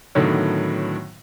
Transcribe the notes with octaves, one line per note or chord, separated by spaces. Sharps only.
A2 D3 D#3 F#3 B3